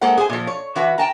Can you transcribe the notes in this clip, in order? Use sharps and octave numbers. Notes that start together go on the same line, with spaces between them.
G#3 A#3 A4 C5 F#5
G#4 C5 G#5
A#2 F3
C#5
E3 F#4 B4
G5 A5 A#5